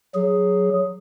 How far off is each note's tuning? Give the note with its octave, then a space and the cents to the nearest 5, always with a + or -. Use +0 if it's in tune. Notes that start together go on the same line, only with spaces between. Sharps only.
F#3 +0 G#4 +0